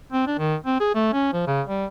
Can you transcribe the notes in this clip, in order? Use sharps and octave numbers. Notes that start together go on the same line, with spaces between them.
C4
D4
D#3
C4
G#4
A3
C#4
F3
C#3
G3